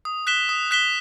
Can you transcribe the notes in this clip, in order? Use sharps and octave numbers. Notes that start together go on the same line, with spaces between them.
D#6
F#6 B6 E7 G7
D#6
F#6 B6 E7 G7